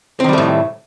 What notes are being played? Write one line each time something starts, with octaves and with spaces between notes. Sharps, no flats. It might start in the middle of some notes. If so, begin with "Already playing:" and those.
A2 D#3 G3 A3 C4